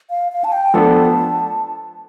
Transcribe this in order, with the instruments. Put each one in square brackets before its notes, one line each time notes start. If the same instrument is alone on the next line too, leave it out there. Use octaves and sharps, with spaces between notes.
[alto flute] F5
F5
A5
G5
[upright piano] F3 B3 D4 A4 [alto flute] A5